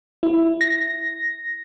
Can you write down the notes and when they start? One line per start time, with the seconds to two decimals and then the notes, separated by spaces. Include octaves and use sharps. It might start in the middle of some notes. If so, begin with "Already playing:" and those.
0.23 E4
0.61 A#6